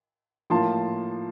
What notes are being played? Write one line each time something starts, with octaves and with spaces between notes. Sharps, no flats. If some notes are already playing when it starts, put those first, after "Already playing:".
A2 F3 A#3 F4 A5 C6